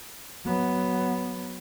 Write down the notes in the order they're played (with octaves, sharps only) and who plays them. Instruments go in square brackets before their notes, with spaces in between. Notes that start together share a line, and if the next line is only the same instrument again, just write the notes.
[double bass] F#3 B3